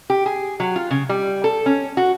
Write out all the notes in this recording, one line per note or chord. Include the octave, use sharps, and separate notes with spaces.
G4
G#4
F#3
F4
C#3
G3
A4
C#4
F#4